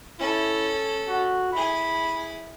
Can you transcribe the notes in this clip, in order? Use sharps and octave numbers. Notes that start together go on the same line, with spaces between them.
C#4 E4 A4
F#4
E4 G#4 B5